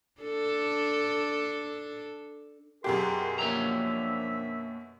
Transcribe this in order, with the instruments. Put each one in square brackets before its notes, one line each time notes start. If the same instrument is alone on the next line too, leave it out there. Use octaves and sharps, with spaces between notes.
[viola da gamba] D4 A4
[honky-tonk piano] F#2 B2 G4 [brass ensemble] G#4 A#4 [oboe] C6
[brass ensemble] F3 D4 A#4 [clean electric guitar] A#3 C#5 A#5 [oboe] E5